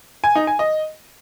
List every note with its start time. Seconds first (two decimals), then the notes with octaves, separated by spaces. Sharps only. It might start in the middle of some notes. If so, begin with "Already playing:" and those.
0.24 G#5
0.35 D#4
0.47 G#5
0.59 D#5